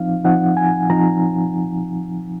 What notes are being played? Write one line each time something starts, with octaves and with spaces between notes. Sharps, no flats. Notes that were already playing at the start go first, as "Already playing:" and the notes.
Already playing: F3 C4 D#4 F5
F3 C4 D#4 F#5
G#5
F3 C4 D#4 A#5